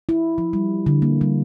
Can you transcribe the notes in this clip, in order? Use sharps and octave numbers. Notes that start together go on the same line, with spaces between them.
E4
F3
G3
D3
A#3
G3